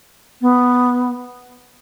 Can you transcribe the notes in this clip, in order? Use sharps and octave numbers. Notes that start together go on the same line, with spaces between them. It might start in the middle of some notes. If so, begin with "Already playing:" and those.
B3